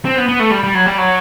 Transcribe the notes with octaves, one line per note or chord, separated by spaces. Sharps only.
C4
B3
B3
A3
G3
G3
F#3
G3
F#3